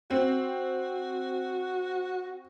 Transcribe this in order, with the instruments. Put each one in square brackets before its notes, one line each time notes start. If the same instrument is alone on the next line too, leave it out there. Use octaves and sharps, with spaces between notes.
[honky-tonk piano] C4 [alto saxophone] F#4